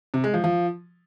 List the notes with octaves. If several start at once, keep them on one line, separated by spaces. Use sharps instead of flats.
C3
G#3
F3
F3